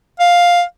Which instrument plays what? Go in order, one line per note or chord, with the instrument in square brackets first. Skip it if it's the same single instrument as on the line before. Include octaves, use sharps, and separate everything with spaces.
[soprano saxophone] F5